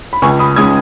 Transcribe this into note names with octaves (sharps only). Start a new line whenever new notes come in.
B5
C#2 G#5 C#6
B5 D#6
C#3 G#3 D#6 G#6